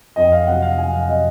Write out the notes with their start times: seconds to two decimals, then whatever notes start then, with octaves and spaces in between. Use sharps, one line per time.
0.16 F2 D#5
0.32 F5
0.47 C3 F#3 F#5
0.62 F5
0.78 F2 G#5
0.93 F5
1.08 C3 F#3 D#5